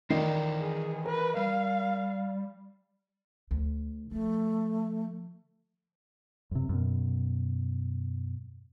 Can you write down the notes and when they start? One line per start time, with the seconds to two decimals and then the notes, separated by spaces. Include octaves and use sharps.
0.10 D#3 E3 F4 D5 D#5 C7
0.61 G#4
1.06 A#4 B4
1.37 G3 F5
3.51 D2
4.11 D3 F3 A3
6.51 F#2 C3
6.69 F#2 B2